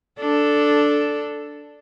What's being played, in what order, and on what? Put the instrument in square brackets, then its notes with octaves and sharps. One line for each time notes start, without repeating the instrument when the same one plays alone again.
[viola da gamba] D4 A4